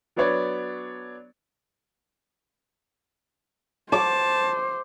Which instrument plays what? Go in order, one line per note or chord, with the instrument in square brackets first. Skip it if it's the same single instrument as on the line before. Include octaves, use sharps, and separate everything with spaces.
[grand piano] F#3 B3 D4 B4 C#5 D5
[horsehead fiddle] C5 [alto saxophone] A5 [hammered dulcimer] D6